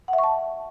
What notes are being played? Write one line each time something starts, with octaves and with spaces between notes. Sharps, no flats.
F#5
E5
C#6
A5